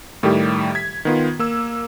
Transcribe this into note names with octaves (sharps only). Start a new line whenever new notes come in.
A2 D#3 G3 G4
G#6 B6
D#3 B3 F4
A#3 E6